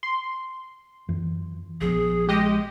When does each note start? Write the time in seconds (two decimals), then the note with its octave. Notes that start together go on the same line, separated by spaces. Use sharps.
0.03 C6
1.09 F#2 E3
1.81 A#1 F3 B3 G#4
2.29 G#3 G4 D#5